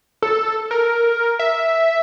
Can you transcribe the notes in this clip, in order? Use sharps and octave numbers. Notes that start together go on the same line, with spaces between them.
A4
A#4
E5